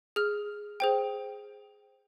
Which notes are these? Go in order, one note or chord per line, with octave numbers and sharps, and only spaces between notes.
G#4 F6
G#4 C5 G5